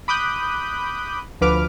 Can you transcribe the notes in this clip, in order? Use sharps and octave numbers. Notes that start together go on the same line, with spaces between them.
B5 D6 D#6 F#6 G6
D2 F3 B4 D6 F6